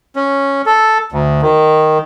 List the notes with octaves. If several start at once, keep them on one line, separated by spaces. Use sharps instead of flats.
C#4
A4
D2
D#3